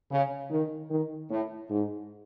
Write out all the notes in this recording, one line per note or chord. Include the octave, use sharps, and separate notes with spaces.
C#3
D#3
D#3
A2
G#2